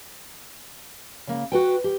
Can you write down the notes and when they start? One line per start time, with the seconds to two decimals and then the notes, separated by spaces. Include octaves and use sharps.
1.27 C#3 A#3
1.52 F#4 B4 G5
1.84 G4